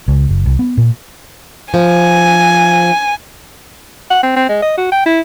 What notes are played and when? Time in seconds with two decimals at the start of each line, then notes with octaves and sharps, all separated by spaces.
0.08 C#2
0.29 F#1
0.46 C2
0.59 B3
0.77 A#2
1.74 F3 G#5
4.10 F#5
4.23 C4
4.36 C4
4.49 G#3
4.62 D#5
4.77 F#4
4.92 G5
5.06 E4